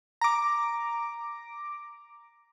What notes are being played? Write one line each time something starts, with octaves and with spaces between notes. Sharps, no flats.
A#5 D6